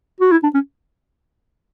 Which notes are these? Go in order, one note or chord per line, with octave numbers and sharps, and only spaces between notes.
F#4
E4
D4
C#4